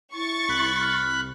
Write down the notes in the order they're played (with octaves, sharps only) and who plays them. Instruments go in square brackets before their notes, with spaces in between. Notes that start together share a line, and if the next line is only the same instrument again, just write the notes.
[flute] E4 [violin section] C#6 A6
[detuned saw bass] C2 [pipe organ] B5 F#6
[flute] F6